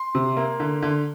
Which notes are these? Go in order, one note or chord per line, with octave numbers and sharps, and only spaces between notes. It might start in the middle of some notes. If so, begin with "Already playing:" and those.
Already playing: C6
C3
A#3
D3
D3